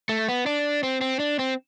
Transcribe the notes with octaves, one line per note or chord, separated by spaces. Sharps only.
A3
B3
D4
C4
C4
D4
C4